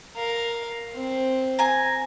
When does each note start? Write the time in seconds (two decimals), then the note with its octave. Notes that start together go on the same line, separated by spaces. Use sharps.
0.16 A#4 F5
0.95 C4
1.59 G#5 A#5